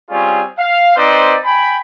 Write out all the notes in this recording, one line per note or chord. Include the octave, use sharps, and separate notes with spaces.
G3 C4 C#4 F4 G#4
F5
C4 D#4 B4 C5 D5
G5 G#5 B5